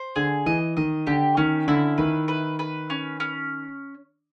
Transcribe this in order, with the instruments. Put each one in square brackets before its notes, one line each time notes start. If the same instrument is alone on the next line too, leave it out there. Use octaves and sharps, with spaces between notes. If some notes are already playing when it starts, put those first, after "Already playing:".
Already playing: [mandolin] C5
[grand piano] D3 [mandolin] G#4
[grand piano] E3 [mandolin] D#5
[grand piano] D#3 [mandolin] D#5
[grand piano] D3 [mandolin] G4
[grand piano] D#3 [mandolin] C#4
[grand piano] D3 [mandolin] E4
[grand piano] D#3 [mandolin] B4
[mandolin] B4
B4
C#4
C#4